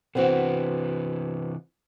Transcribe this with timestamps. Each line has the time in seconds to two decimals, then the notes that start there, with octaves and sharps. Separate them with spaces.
0.15 C3 E3 B3 C4 F#4